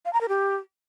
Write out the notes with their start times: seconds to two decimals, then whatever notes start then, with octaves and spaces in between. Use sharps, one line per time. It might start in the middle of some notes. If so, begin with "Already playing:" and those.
0.05 F5
0.13 A#5
0.21 A#4
0.29 G4